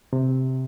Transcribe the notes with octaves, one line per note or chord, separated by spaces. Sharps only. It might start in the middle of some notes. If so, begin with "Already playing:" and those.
C3